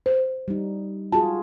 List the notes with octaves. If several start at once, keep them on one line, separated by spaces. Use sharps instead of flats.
C5
G3 D#4
F4 F#4 G#4 A5